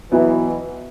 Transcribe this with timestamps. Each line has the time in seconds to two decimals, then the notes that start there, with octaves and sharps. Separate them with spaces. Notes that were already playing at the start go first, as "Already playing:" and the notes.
0.11 B2 E3 F#3 B3 E4 B4